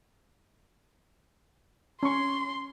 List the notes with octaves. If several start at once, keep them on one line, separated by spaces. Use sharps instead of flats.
C#4 C6 C#6